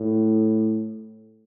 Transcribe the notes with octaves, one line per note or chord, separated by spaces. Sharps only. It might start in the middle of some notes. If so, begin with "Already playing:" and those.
Already playing: A2